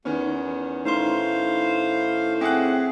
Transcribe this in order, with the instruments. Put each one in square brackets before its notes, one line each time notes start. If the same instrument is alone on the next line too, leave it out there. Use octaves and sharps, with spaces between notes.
[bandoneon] E2 [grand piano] D#3 B3 C#4
[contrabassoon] A2 [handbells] D#4 C6 [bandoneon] C5 F5
[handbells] C4 G5 [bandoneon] G#4 [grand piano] E5 F#5 F#6